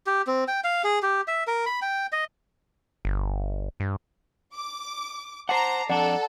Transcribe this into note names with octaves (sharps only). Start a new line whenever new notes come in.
G4
C4
G5
F5
G#4
G4
E5
A#4
B5
G5
D#5
G1
G2
D6
C5 F#5 A5 A#5 D6 C7
F2 D4 A4 D5 F#5 A#5